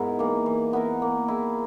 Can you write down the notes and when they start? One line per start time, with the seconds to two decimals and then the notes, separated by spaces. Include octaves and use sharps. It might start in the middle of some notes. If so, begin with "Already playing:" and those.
Already playing: G#2 B3 E4 A#4
0.19 E3 A#3
0.46 E3
0.73 B3 E4 A#4
1.02 A#3
1.28 E4 G#4